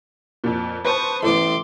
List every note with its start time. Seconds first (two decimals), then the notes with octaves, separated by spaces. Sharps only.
0.44 F2 A#2
0.85 B4 C5 A5 C#6 D#6
1.23 A1 A2 B3 A4 C6 D6